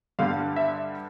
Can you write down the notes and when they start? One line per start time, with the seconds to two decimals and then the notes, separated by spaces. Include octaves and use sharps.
0.19 G2 D3 G3 F5
0.56 E5